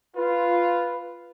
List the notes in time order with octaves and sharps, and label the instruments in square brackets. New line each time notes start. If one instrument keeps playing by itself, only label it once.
[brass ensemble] F4 [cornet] B4